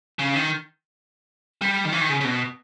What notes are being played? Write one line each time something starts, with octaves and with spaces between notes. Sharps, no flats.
C#3
D#3
G3
D#3
E3
D#3
C#3
C#3
B2